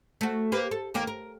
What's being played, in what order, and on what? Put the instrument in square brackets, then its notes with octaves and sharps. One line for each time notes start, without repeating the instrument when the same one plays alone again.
[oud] A3 F#4
A#3 G4 B4
A4
D#2 A#3 G4
A#4